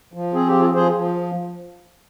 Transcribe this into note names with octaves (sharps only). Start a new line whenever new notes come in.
F3
C4 G#4
G4
F3
F4 G#4
F3 G#4 C5
F3